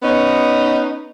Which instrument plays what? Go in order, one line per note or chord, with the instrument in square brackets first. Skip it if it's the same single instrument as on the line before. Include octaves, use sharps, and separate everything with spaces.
[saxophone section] B3 C#4 D#4